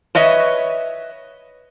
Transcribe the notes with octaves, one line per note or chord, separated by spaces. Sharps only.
B4 C#5 D#5 E5